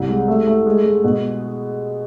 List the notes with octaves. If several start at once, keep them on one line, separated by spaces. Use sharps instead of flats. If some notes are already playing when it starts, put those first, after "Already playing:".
Already playing: C2
G#3
A3
A3
G#3
G#3
B2